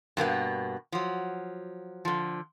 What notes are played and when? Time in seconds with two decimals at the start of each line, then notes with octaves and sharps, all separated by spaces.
0.17 G2 B2 A#3 B3
0.92 F3 F#3
2.05 D3 F3